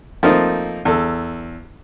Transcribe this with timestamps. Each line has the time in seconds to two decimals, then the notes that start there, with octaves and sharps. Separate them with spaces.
0.23 F3 A3 A#3 C4 D#4
0.85 E2 A4